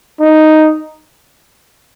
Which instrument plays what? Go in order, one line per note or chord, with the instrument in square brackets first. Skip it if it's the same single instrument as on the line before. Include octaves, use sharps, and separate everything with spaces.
[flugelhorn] D#4